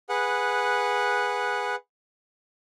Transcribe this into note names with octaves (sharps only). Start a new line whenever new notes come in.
G#4 B4 F#5